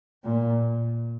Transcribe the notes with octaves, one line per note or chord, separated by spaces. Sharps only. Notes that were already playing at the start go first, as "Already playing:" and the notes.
A#2